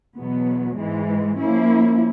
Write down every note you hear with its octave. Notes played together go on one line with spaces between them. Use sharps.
E2 B2 F#3 B3
G#2 E3 G#3
F3 A#3 C#4 E4